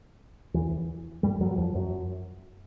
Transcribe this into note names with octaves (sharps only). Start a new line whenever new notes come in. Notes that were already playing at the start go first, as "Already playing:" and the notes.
E2 E3
G2 G3
F#2 F#3
F#3
F2 F3
F#2 F#3